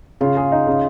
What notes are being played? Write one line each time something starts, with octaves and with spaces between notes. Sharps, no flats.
C#3 F4
G#4
D#4
C#3